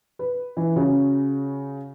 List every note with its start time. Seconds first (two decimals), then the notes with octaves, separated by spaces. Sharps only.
0.19 B4
0.57 E3
0.76 C#3 F#4